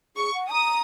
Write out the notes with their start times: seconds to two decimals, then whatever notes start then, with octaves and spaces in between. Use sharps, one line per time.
0.16 G#4 C#6
0.34 F#5
0.51 A#5 D#6